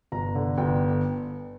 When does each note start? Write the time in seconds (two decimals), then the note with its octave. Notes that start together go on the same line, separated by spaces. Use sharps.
0.12 G1 A#5
0.35 D3
0.58 G1 G5